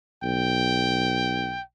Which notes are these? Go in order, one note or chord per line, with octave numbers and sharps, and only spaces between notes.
B1 G5